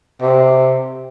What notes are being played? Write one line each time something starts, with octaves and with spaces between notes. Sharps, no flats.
C3